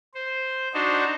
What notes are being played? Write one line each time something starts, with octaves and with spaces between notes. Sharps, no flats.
C5
D4 D#4 F#4 C5